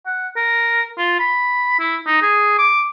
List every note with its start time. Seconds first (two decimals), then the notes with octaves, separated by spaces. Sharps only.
0.06 F#5
0.36 A#4
0.98 F4
1.20 B5
1.79 E4
2.07 D#4
2.22 G#4
2.58 D6